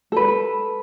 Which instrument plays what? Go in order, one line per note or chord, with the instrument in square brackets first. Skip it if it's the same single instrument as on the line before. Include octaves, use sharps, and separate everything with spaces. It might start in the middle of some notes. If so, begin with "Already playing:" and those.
[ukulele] A4 B4